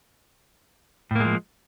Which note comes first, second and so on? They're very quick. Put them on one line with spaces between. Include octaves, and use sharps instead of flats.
A2 A#3 G#3 F3